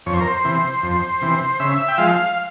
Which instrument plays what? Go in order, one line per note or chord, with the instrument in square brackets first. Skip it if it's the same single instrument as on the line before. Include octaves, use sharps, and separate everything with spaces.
[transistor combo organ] F2 C#5
C5
A#4
C5
C3 E3
F2
C3 E3
C#3 E5
G5
F3 G#3 F5